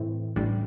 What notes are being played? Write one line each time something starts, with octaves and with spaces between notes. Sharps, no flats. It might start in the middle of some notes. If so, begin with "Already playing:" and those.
Already playing: A2 E3 A3 C4
A1 A2 G3 D4